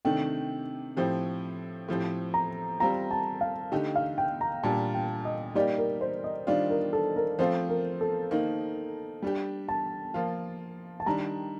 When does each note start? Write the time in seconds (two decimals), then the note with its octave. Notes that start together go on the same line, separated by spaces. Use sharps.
0.05 C3 D#3 A3 D4 G5
0.97 A2 F3 C4 G4
1.88 A2 F3 C4 G4
2.34 A#5
2.80 G3 C4 F4 A#5
3.11 A5
3.41 F5
3.72 D3 A3 D#4 G4 G5
3.96 F5
4.18 G5
4.41 A#5
4.63 A#2 G3 D4 A5
4.94 G5
5.25 D#5
5.55 G3 A#3 D#4 G4 D5
5.78 A#4
6.01 C5
6.24 D#5
6.47 D#3 G3 D4 F4 D5
6.70 A#4
6.93 A4
7.16 A#4
7.39 F3 A3 C4 F4 C5
7.69 A#4
8.01 A4
8.31 D#3 A#3 D#4
9.22 G3 D4 G4
9.68 A5
10.14 F3 A#3 F4
11.00 A5
11.06 D#3 G3 D4 A#5